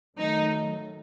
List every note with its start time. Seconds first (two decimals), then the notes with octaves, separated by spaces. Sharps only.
0.18 D#3 F#3 A3 D#4